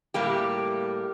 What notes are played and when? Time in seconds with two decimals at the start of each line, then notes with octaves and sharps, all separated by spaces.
0.14 A2 G3 A#3 G4